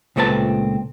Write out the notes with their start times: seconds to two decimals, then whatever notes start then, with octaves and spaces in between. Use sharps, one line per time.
0.16 C#2 A#2 A3 C4 B4 A5